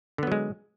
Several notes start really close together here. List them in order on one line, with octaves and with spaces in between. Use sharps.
D3 B3 F#3 G#3